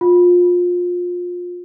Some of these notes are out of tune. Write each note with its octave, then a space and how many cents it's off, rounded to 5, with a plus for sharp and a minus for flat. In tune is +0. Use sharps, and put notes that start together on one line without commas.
F4 +25